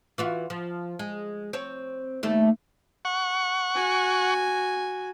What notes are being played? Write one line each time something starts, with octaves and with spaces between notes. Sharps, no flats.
E3 F4 F#4
F3
G#3
C4 C#5
D#2 G3 A3
F#5 C#6
F#4 G#5